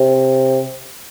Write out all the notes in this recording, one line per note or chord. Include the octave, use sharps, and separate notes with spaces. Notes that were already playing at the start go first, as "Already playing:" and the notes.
Already playing: C3